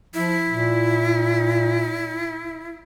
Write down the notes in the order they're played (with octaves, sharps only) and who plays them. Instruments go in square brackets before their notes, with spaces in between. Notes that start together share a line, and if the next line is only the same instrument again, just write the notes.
[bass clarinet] F3 [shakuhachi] E4
[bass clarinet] A#2